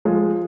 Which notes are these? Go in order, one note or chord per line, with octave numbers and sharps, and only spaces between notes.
F3 G#3